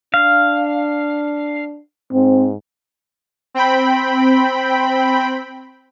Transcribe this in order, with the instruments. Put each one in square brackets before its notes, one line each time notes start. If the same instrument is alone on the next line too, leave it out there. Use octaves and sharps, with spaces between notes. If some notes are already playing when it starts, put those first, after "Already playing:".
[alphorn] D4 [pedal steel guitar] F5
[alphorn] G#2 [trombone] C4
[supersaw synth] C4 G5 B5